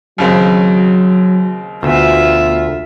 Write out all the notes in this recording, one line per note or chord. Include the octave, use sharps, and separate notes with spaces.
D#2 C#3 F#3 C4
D2 B2 F4 E5